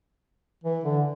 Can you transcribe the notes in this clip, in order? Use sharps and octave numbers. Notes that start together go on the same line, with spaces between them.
E3
D3